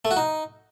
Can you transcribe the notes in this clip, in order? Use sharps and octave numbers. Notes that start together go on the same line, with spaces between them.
A3
F#4
D#4